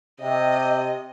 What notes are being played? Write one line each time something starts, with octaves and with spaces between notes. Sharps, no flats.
C3 D#5